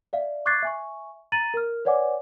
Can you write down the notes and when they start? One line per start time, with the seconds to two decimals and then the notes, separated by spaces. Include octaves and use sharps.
0.13 D5 E5 F5
0.46 C#6 D6 F#6 G#6 A6 C7
0.63 E5 G#5 C#6
1.32 A#5 A6 D#7 F#7
1.54 A#4 F6
1.85 B4 C#5 D5 F#5 G#5 D6